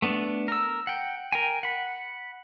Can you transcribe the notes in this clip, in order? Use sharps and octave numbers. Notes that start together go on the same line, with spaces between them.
A3 B3 D4
A#4 E6
F#5 G5
A#4 G5 G#5
F#5 B5